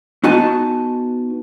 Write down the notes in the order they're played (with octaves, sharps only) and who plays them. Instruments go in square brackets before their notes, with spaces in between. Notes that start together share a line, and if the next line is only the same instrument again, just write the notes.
[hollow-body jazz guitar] B3 D#4 F#4 D#5 G#5 A5